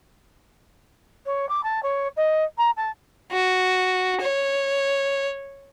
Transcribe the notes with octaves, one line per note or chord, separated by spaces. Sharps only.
C#5
D6
A5
C#5
D#5
A#5
A5
F#4
C#5